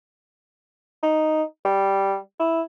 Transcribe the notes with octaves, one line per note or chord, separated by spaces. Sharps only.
D#4
G3
E4